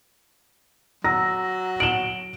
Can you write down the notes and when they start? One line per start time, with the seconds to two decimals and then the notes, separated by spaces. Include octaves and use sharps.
1.04 F#3 A#5 E6 A#6
1.80 D7 E7 F#7 G7